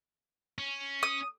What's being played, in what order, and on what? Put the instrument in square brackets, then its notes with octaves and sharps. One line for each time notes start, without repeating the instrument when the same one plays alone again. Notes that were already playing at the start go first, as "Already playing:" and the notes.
[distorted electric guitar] C#4
[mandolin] D#6